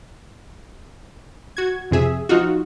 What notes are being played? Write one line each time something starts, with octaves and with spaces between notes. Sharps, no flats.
F#4 G#6
F2 C3 G#4 E5
F3 D#4 F4 F#4